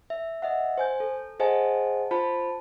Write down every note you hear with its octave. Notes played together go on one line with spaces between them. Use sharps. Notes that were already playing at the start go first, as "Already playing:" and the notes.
E5
D#5 E5 F#5
C5 G#5 G6
A4
G#4 C5 D#5 F#5 G#5 A5
F4 C5 A5 B5